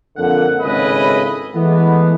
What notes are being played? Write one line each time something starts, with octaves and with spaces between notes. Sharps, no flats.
F2 D3 A#3 F#5
G#1 A2 C#3 E4 B4 D#5
E3 G#3 A3 B3